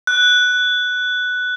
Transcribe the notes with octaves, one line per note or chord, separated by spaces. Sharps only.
F#6